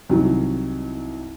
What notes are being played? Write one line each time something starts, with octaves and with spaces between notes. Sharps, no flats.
C2 D#3 F#3